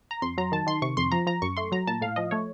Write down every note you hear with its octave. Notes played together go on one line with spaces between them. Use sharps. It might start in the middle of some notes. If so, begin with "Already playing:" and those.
A#5
F2 C6
F#3 A#5
D#3 A5
D#3 C6
C3 C#6
F2 C6
F3 A#5
F3 A#5
F#2 C#6
A3 C6
F#3 A#5
A#2 A5
A2 F5
F3 D#5
A3 C#5